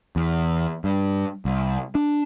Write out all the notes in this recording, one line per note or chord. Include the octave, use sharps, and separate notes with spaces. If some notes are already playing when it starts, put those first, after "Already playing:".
E2
G2
C2
D4